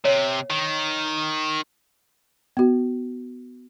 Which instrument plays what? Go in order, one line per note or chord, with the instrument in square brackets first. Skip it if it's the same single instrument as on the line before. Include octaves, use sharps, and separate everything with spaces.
[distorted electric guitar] C3 [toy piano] C#5
[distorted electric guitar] D#3
[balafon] B3 F#4